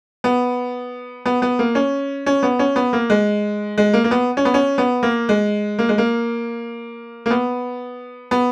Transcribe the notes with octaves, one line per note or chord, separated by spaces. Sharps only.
B3
B3
B3
A#3
C#4
C#4
B3
C#4
B3
A#3
G#3
G#3
A#3
A#3
B3
C#4
B3
C#4
B3
A#3
G#3
A#3
G#3
A#3
A#3
B3
B3